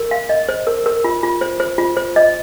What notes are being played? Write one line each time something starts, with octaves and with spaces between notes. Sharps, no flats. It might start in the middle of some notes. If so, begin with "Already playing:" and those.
Already playing: A#4
F5
D#5
C5
A#4
A#4
F4
F4
C5
C5
F4
C5
D#5